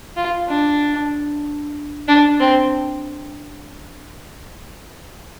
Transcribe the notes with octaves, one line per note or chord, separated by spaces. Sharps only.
F4
D4
D4
C4